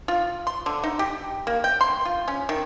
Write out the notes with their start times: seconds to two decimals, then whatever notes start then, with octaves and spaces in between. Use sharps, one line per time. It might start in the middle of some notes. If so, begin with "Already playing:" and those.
0.08 F4
0.47 C6
0.66 D3
0.84 D#4
0.99 G4
1.47 A#3
1.64 G5
1.81 C6
2.05 F4
2.28 C#4
2.49 D#3